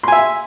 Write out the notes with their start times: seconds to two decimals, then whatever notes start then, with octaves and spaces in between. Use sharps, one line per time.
0.03 C6
0.08 G#5
0.12 E5